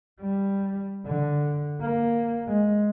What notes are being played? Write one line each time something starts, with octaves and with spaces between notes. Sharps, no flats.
G3
D3
A#3
G#3